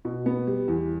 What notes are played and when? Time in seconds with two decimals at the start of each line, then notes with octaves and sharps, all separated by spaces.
0.05 B2
0.26 B3
0.47 G3
0.68 E2